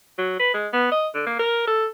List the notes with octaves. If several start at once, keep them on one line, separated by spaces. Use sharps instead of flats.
F#3
B4
G#3
B3
D#5
D3
A#3
A#4
A4